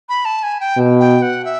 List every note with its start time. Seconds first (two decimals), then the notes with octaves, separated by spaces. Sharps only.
0.09 B5
0.25 A5
0.43 G#5
0.60 G5
0.77 B2
1.00 G5
1.22 F#5
1.45 E5